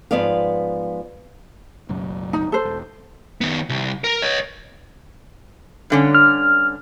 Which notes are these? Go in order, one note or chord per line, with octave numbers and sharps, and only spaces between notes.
G#2 F3 B3 D5 F5
F#1 B1 F#2
D#4
A4 C5
E1
D#3 B3
C2
A#4
C#5 D#5
G2 D3 C#4
F6